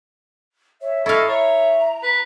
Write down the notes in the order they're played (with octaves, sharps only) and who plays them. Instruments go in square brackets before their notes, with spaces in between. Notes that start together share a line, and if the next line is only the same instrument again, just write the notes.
[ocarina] C#5 [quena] E5
[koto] E4 F5 [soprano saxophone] A4 [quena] D#5 [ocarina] C#6
[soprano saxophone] C#5 [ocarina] E5 [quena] A#5
[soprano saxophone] B4